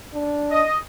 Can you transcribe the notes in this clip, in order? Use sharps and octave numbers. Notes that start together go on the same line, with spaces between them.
D4
D#5